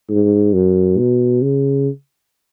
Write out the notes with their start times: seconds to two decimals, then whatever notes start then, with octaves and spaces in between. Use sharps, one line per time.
0.10 G#2
0.54 F#2
0.98 B2
1.42 C#3